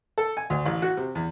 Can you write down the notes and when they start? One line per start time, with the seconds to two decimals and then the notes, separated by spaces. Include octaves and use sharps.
0.18 A4
0.37 G#5
0.50 D2
0.66 A1
0.82 F#4
0.97 C3
1.15 E2